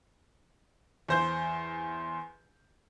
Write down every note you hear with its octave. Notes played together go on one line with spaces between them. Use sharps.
E2 C5 G6